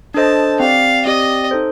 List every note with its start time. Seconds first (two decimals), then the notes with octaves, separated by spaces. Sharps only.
0.14 D4 A4 C5 D#5 A5
0.60 C4 G4 D5 F5
1.06 C4 G4 D5 D#5
1.51 D#4 A4 C5